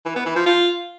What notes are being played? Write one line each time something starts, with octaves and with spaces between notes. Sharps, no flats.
E3
B3
E3
F3
F4